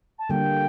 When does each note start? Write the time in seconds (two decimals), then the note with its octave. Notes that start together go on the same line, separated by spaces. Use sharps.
0.18 A5
0.29 D3 G3 A#3 G5